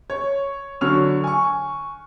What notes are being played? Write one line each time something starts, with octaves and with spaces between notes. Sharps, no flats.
C#5
D3 F#3 C#5 C#6 F6 F7
G#5 C#6